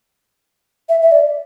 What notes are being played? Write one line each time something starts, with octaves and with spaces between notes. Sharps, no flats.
E5
E5
D5